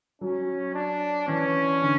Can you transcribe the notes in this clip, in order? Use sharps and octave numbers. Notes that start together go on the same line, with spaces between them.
F#3 C#4
D4
E3 C#4
D3